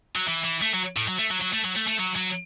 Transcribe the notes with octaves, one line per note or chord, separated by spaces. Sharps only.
F#3
E3
E3
A3
F#3
A2
F#3
A3
F#3
F#3
A3
F#3
A3
A3
F#3
F#3